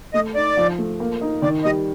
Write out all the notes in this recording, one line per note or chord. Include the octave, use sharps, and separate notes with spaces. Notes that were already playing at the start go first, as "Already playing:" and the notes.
A3 D#5
D#4 D5
F3
A3
A#3
D#4
D#3 D5
G3 D#5